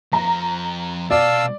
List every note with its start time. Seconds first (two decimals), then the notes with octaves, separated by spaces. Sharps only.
0.13 F2 F3 A#5
1.11 B2 D5 F5 A5 E6